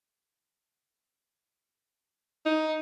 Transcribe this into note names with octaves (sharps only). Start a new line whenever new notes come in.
D#4